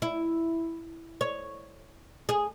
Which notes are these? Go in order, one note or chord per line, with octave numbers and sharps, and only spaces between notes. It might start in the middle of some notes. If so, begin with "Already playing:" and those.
E4
C#5
G#4